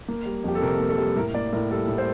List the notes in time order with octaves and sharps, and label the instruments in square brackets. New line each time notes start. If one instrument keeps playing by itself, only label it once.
[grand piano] A#3
G3
F2 G4
A4
C3 A#4
A#3
A4
G3
A2 A#4
A#3 D5
A2 A#4
G3 A4
A2
C5